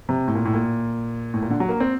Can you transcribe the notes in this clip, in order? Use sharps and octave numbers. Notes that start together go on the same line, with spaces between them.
C3
A2
A#2
A2
A#2
A2
A#2
D3
F#3
A#3
C4